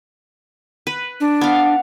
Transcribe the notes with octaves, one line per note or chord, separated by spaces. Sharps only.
B4
D4
B3 F5